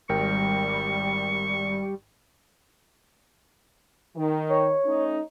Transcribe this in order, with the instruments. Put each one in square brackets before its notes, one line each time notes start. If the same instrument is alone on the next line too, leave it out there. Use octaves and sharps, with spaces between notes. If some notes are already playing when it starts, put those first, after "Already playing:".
[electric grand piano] G#1 A#4 G5 [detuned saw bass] G3 [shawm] C#6
[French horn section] D#3
[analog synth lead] C#5
[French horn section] A3 C#4 D#4